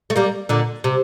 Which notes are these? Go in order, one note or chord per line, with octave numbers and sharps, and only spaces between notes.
A3
G3 A#3
A#2 D3
C3